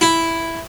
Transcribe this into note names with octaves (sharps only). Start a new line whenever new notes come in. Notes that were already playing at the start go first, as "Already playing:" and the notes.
E4